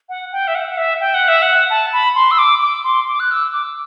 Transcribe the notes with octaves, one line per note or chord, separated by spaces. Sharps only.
F#5
G5
E5
F#5
F#5
E5
G5
F#5
E5
F#5
A5
B5
C6
E6
D6
D6
C6
D6
F#6
E6
D6